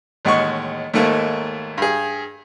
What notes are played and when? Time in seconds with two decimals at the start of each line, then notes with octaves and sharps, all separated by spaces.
0.25 A1 D#2 G#3 F#5 C#6
0.94 D#2 G#2 A3 A#3
1.78 G2 G#4